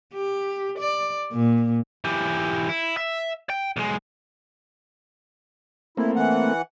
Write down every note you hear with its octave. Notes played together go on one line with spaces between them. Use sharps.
G4
D5
A#2
E3 G4
E4
E5
G5
B1 G#3
A3 A#3 C4 E4
E3 F#5